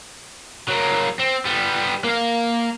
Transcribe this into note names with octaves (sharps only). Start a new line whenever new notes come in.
F#3 A#3
C4
G3 B3
A#3 F5